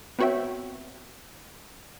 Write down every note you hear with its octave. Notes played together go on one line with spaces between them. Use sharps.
B3 C4 F#4 C#5 E5 G5